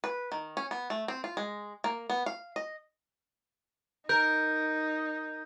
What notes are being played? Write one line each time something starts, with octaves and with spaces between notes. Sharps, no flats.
B4
D#3
C#4
B3
A3
C4
F4
G#3
A#3
B3
F5
D#5
D#4 A#4 G6